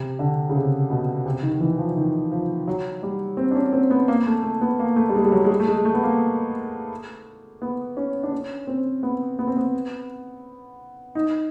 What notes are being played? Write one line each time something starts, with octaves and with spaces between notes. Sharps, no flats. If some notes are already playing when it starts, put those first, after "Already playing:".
Already playing: C3
D3
C#3
C3
B2
C3
D#3
E3
F3
D#3
F3
F#3
G3
C4
D4
C#4
C4
B3
A#3
A3
A3
B3
A#3
A3
G3
G#3
G3
F#3
G#3
G3
A3
G#3
A3
B3
A#3
B3
C#4
D4
C#4
C4
B3
B3
C4
B3
D#4